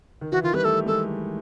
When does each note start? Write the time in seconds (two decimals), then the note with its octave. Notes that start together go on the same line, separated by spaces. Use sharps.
0.21 D#3
0.32 E3 F#4
0.43 D#3 F4
0.54 G3 B4
0.64 A3 A4
0.86 G#3 A4